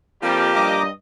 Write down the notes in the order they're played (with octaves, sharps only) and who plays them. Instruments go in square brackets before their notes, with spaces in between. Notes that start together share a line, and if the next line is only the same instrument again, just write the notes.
[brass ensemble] F2 G3 [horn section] F3 A#3 G4
[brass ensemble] G2 D#5 [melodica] A#5 D6